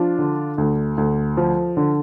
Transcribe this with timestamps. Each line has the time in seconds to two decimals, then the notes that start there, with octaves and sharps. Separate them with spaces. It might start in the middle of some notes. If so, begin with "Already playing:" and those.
Already playing: F3 D4 F4
0.19 D3
0.58 D2
0.97 D2
1.37 F3
1.77 D3